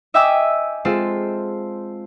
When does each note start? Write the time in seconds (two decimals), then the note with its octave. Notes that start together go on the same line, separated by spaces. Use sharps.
0.14 D#5 E5 G5 G#5 D6 E6
0.85 G#3 C4 F4 A4